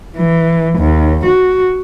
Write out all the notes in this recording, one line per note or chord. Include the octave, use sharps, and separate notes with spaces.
E3
D#2
F#4